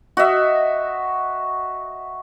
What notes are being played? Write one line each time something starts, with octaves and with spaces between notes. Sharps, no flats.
F#4 D#5 E5